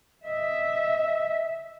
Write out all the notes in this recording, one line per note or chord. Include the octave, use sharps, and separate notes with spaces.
D#5 E5